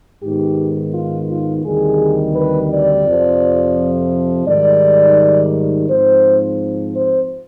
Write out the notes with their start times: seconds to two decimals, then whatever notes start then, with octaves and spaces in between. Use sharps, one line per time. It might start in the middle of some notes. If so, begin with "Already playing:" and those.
0.23 G#2 D#3 B3 G4
0.93 F4
1.29 F4
1.64 D2 C3 D#3 G3 G#4
2.35 B4
2.70 D5
3.06 F2 C3 F3
4.47 G#2 D#3 G3 D5
5.89 G#2 F3 C4 C5
6.96 C5